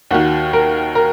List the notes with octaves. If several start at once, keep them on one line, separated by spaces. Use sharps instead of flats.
D#2 D#3 F#4
A#4
A#4